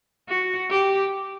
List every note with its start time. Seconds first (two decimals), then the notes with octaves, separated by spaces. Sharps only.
0.29 F#4
0.70 G4